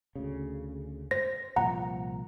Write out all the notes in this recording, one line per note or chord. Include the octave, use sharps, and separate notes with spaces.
D2 C#3
C5 A#6
C2 A#2 F3 F#5 A#5